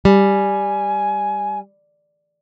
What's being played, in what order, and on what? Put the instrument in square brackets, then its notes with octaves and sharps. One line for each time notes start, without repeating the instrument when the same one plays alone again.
[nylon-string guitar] G3 [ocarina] G#5